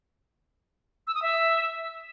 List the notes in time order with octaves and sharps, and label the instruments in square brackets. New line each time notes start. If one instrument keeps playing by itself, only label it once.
[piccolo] E6
D#6
E5